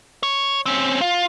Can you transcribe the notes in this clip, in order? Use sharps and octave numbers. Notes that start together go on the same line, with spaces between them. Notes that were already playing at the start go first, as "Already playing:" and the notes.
C#5
C4 C#4
F4